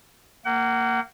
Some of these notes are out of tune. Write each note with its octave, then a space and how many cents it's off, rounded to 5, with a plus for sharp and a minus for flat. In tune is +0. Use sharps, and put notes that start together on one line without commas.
A#3 -15 F#5 +35